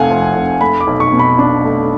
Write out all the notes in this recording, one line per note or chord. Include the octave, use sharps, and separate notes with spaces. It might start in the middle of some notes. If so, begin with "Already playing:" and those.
Already playing: F1 F2 A3 F5 F#5 G#5
F3
F1
A3 B5
D6
B1
C#6
B2
B5
D4
A3